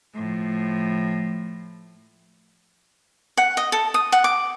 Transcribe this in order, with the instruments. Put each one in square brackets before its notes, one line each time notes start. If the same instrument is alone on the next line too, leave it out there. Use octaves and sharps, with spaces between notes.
[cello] A2 F3
[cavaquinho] F#5
D#5
A4
D#6
F#5
D6